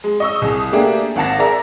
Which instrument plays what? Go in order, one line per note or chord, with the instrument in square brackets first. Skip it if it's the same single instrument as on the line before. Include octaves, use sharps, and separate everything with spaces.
[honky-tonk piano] G#3
D#5 C#6 E6
C2 G#4 D#6
A3 A#3 D4 G4 G#4
G#1 F#5 A5 A#6
G#4 A#4 D5 E5 A#5